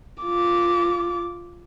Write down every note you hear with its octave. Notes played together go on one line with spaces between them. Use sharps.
F4 D6